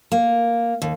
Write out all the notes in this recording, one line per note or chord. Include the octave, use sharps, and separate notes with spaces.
A#3
D#2